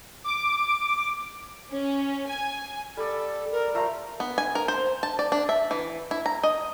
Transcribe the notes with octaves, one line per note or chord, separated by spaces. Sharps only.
D6
C#4
G#5
G3 A4 D5
A#4
F3 A3 A#5 C6
B3
G#5
A#4
C5
A5
D5
D4
E5
E3
E4
A#5
D#5